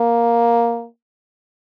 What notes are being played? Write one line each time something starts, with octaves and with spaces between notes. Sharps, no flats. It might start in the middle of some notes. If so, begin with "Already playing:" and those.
Already playing: A#3